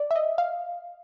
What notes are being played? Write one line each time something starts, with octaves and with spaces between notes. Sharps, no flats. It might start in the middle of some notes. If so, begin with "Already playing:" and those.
Already playing: D5
E5
D#5
F5